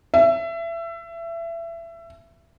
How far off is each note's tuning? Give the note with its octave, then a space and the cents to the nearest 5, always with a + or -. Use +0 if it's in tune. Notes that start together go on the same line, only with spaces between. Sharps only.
E5 +25